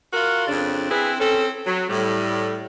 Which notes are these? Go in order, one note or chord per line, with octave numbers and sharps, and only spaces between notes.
F4 F#4 A#4
F2 C#3 D4
C4 E4 G#4 B4
C4 C#4 A4
F#3
A2 G3